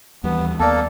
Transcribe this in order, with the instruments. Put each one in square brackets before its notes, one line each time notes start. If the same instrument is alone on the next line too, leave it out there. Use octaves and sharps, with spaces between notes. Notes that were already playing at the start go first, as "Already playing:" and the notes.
[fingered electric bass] D#2 E3 G3 [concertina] B3
[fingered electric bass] D#2 B3 [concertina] A#3 A4 [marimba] D5 A5